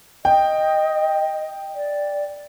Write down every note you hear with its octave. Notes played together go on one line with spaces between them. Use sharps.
D#5 G5
D5